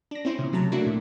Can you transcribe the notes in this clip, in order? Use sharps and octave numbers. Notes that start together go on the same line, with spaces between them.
D4 A#6
C4 C#4 E4 C5
A#2 C#3
C3 F#3 A3 A5 A#5
F#3 A3 A#3 D4 E4 F#4
A#2